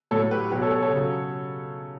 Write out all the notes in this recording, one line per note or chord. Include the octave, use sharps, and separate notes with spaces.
A2 F#3 A4 C#5
G4 B4
B2 F#3 G4 B4
A4 C#5
A4 C#5
A4 C#5
C#3 F#3